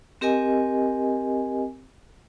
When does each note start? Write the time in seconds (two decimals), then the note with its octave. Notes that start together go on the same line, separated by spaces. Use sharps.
0.21 C4 G4 A#4 D#5 G#5